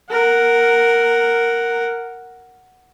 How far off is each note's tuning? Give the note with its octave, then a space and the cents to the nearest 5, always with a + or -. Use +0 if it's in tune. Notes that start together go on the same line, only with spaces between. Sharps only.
A#4 -5 F#5 +0